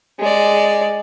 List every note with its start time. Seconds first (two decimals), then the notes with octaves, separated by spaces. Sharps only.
0.20 G#3 D5